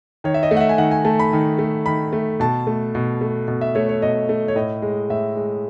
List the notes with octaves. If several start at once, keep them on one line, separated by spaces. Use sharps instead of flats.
D#3 C#5
E5
D#5
A3
F#5
E5
G#5
D#3 F#5
G#5
A3 A5
B5
D#3
A3
D#3 B5
A3
B2 A5
A3
B2
A3
B2
E5
A3 C#5
C#5
B2 D#5
A3
C#5
A2 D#5
G#3
A2 E5
G#3